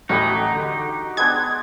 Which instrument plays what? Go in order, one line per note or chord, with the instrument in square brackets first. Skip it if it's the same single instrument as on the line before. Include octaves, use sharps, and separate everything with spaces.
[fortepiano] A1 B5 [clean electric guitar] D#4 [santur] F#4 G4 D#5
[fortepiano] D3
[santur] G#3 B3 D4 [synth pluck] G#6